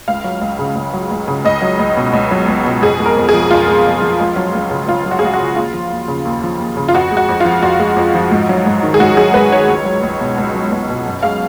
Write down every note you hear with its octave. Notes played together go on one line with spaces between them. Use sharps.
C#2 F5
F#3
C#2
C#3
C#2
F#3
C#2
C#3
C#2 D#5
F#3
C#2
B2
C#2
F#3
C#2
B2
F2 G#4
G#3
A#4
F2
F3 G#4
F2 F4
G#3
F2
F3
C#2
F#3
C#2
C#3
C#2 F4
F#3
F#4
G#4
C#2 F#4
F#4
C#3
D#2 F4
F3
D#2
C#3
D#2
F3
D#2
C#3
F4
F2 F#4
G#3
F#4
F2
F3 F4
F2 F#4
G#3
F2
F3
G#2
F#3
G#2
D#3
G#4
G#2 F#4
F#3 G#4
G#2 B4
D#3 C#5
C#2
F#3
C#2
B2
C#2
F#3
C#2
B2
F#2
G#3 F5